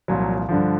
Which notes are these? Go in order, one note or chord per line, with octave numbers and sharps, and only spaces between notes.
C2 A#2 F3 F#3
G2 D3 F3